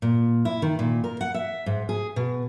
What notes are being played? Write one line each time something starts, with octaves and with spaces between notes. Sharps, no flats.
A#2
E4
D#3
A#2
A#4
F#5
E5
G#2
G#4
B2